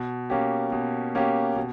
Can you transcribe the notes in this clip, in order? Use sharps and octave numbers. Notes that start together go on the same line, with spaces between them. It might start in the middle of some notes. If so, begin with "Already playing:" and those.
Already playing: B2
A#3 C#4 G4
B2
A#3 C#4 G4
B2